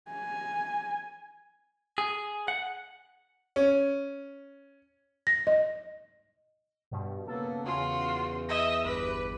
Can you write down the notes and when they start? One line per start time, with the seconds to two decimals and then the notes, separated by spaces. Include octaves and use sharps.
0.11 G#5
1.98 G#4
2.48 F#5
3.56 C#4
5.27 A#6
5.47 D#5
6.91 G2 B2
7.27 C#3 A#3 B3 A4
7.64 E2 C#3 F4 F#4
8.49 D#5 E5 A#6
8.85 G1 B4 B5 D6